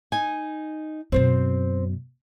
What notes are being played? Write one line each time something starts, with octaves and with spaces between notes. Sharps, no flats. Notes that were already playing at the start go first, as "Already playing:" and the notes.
D#4 G#5
F#2 B2 C4 C5